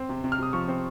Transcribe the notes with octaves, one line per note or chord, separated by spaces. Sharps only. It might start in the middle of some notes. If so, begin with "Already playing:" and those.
Already playing: C4
C3
C3
F6
C3 D#6
F3 C#6
C4